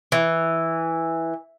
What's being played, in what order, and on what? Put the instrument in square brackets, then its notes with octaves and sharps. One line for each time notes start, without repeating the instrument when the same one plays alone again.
[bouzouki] E3